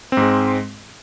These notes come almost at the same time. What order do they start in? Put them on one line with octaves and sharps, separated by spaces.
C4 G#2 G#3